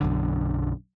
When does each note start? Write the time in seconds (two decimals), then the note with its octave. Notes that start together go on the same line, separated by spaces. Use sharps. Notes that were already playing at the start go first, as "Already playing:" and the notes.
0.01 B1 F#2 D3